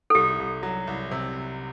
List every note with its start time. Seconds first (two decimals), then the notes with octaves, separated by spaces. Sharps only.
0.10 A4
0.15 C2 G4
0.39 C2
0.63 F#3
0.87 C2
1.11 C3